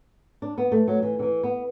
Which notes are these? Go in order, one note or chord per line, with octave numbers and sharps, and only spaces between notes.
D4
B3
A3
F#3
E3
D3
E3
B3